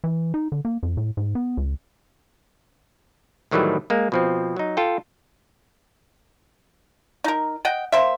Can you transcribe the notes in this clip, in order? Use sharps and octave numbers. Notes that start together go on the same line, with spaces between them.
E3
D#4
D3
A#3
F2
A2
G#2
B3
C#2
A2 D#3 E3 F#3 G3 A3
G#3 A#3
B2 F3 C4
F#3 D#4
F4 A4 G5
D#4 A#4
D#5 F#5 G5
A#3 C5 E5